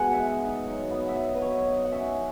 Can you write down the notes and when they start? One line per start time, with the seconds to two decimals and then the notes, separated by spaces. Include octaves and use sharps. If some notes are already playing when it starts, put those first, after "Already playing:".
Already playing: B2 G#3 F#5 G#5
0.13 D#4 E5
0.39 D#4
0.65 F#3
0.90 B3
1.09 E5
1.15 F#3 D#5
1.34 B4
1.41 F#3 C#5
1.67 D#4 D#5
1.85 F#5
1.92 C#4 E5